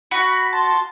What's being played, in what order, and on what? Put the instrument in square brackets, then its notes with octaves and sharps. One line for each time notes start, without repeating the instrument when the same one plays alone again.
[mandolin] F#4 [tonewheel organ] B5
[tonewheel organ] A5 [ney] C6